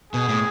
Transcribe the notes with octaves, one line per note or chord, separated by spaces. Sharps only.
B2 G#4
A2